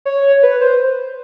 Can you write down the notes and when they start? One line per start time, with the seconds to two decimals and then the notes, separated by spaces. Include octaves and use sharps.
0.05 C#5
0.43 B4
0.61 C5